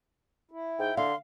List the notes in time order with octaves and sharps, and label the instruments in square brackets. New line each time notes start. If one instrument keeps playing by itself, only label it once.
[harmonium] E4
[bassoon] G#2 [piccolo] G5
[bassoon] D3 [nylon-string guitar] F5 [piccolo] C6